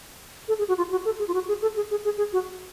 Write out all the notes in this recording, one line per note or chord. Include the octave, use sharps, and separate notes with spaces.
A4
G#4
F#4
F4
F#4
A4
G#4
F4
F#4
G#4
A4
G#4
G#4
G#4
G#4
F#4